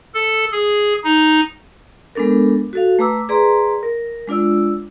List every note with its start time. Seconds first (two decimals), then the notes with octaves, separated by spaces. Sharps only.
0.15 A4
0.52 G#4
1.04 D#4
2.15 G#3 B3 D4 A4 A#4
2.73 F#4 A4 F5
2.99 A3 B4 A#5 D6 E6
3.29 G#4 B4 D5 A#5 C6
3.83 A#4
4.28 G#3 D4 F4 D5 E6